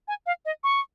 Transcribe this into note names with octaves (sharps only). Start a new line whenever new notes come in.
G#5
F5
D#5
C#6